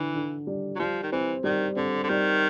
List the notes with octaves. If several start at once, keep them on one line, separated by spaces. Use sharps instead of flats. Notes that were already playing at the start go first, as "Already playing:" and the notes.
Already playing: D3 E3 D4
D3
G3
F#3
F3 G3
D#3
E3 C4
D#3 G3
D3 C4
D3
D#3 G3